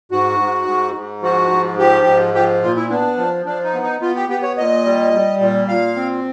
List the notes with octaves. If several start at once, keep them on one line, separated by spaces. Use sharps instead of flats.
G#2 F#4
G#2
G#2
G#2
F3 F#4
G#2
F3 G4
G#2
F3 G4
A#2 F4
E4
B3 D4
F3
F3 D4
D#4
B3
D#4
B3 F4
G4
B3 G4
C#5
A#2 D#5
G3
G3
A#2
A#2 F5
C4